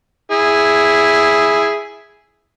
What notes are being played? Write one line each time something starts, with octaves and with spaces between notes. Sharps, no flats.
E4 G#4